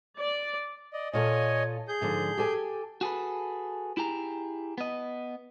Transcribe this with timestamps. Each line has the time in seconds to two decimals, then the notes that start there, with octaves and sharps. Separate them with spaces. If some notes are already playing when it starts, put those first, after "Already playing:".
0.19 D5
0.93 D5 D#5
1.13 A#2 F4 A4 C#5 D#5 G#5
1.88 G#4 G6
2.01 G#2 D3 F3
2.37 G4 A4 G#5
3.01 F#4 G#4 A4 B4
3.97 E4 G4 G#4 A#5
4.78 B3 D#5